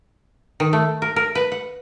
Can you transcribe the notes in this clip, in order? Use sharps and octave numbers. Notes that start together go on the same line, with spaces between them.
D#3
A3
A#4
A#4
B4
F#5